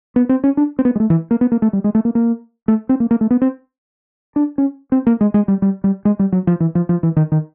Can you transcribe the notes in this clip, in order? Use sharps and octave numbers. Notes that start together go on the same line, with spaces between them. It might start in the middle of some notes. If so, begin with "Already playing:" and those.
B3
C4
C#4
D4
C4
B3
G#3
A3
E3
A#3
B3
A#3
A3
G3
G#3
A3
A#3
A#3
A3
C4
A#3
A#3
A3
B3
C4
D4
C#4
C4
A#3
G#3
G#3
G3
G3
G3
G#3
G3
F#3
F3
E3
F3
F3
E3
D#3
D#3